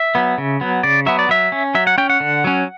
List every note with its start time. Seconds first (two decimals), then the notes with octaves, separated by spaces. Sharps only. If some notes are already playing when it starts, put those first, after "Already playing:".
Already playing: E5
0.15 F#3 B3
0.38 C#3
0.61 F#3 B3
0.83 C#3 D5
1.06 F#3 B3 E5
1.19 D5
1.29 F#3 E5
1.52 C#4
1.75 F#3 E5
1.87 F#5
1.98 C#4 G5
2.10 F#5
2.20 D3
2.44 F#3 C#4